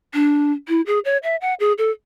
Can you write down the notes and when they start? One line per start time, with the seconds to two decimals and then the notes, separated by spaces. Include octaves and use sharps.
0.14 D4
0.69 E4
0.87 G#4
1.05 C#5
1.23 E5
1.41 F#5
1.60 G#4
1.78 A4